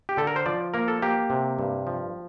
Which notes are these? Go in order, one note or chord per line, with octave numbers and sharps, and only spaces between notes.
G4
D3 A4
A#4
C5
F3 D5
A#3 A#4
A4
A#3 G4
C3
G2
F3